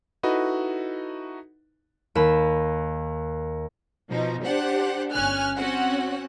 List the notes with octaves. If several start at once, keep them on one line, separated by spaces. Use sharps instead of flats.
D#4 E4 F#4 A4 B4 D#5
D#2 B5 E7
B2 F3 D#4
D4 G4 C5 F#5
G1 C#4 G#5 F6 F#6
C4 C#4 F#4 F#5